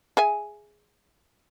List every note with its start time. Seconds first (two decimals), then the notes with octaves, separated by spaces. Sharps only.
0.17 G#4 E5 G#5